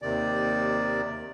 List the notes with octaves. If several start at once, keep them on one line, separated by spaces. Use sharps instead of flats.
D#2 C3 D#3 D5